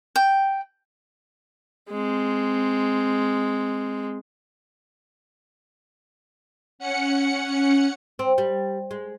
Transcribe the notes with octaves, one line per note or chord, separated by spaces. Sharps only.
G5
G#3 C4
C#4 F#5 C#7
C4
G3
G#3